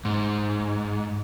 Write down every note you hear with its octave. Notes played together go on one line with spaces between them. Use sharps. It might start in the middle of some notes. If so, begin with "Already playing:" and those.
G#2